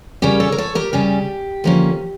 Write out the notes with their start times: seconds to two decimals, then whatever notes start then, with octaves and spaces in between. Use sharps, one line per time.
0.22 C#3 G3 C#4 G4 A#4
0.40 A4 C#5
0.52 A#4
0.58 A4 C#5
0.75 G4 A#4
0.93 C#3 G3 C#4 G4
1.64 D3 F3 A#3 C#4